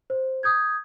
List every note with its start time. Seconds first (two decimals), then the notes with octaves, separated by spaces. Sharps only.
0.10 C5
0.43 D#6 G6 G#6